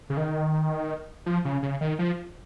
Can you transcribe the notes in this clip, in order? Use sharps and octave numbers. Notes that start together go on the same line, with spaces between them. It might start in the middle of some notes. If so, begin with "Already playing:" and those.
C#3
D#3
F3
C#3
C#3
D#3
F3